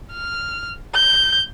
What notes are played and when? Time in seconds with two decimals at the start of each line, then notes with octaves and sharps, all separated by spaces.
0.12 F6
0.95 G6